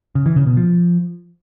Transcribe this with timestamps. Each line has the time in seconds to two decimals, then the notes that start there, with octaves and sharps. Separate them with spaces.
0.15 C#3
0.26 E3
0.36 C#3
0.47 B2
0.57 F3